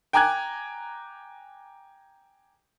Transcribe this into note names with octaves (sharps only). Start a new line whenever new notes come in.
G5 G#5 A#5 D6 F#6 G#6